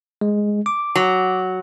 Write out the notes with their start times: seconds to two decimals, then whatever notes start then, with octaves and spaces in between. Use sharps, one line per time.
0.21 G#3
0.66 D6
0.95 F#3